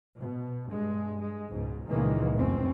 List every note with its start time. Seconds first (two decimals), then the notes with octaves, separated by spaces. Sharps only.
0.18 B2
0.68 G2 G#3
1.19 G#3
1.52 C#2 G#2 B2
1.89 C#2 A#2 D#3 E3 G#3 A#3
2.35 F1 F#2 B2 C4 C#4